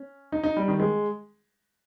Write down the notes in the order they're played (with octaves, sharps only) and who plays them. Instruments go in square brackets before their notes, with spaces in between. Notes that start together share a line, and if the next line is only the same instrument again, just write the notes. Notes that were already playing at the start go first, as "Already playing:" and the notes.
Already playing: [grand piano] C#4
D#4
D#4
G3
D#3
G#3